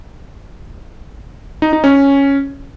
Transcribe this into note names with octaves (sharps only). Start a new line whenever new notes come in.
D#4
D#4
C#4